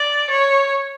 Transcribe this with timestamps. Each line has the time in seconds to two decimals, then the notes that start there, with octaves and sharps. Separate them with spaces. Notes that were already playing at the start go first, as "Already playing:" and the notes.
Already playing: D5
0.30 C#5